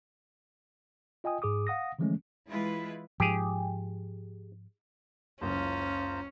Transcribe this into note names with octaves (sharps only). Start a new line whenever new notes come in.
F4 D#5 G5 G#5 D#6
G#2 G#4 D6 D#6
F5 F#5 D#6 A#6
D3 E3 F3 G#3 A3 C#4
E3 G#3 E4 F4 B4
G#2 F3 G4 G#4
F#1 C#2 C#4 F4 C5 A#5